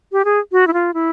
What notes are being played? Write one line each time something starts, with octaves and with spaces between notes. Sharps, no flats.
G4
G#4
F#4
E4
F4
E4